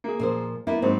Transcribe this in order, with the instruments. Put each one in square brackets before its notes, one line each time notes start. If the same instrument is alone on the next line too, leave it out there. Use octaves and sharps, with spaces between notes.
[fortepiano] A#3 G#4
[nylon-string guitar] A#2 F3 C5
[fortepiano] A#3 [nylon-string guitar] B3 E4
[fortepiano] G#2 C4 [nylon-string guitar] F#3